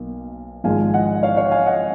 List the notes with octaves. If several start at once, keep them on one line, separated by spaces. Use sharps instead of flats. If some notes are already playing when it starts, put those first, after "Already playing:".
Already playing: B1 B2 A#3
G#1 G#2 F3 G#3 F5 G#5
D#5 F#5
C#5 F5
C#5 F5
F5 G#5
D#5 F#5